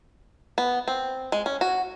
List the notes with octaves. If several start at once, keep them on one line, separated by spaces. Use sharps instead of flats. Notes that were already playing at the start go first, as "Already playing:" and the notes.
B3
C4
G#3
C#4
F#4